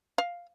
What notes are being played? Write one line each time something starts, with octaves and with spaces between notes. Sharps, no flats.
F5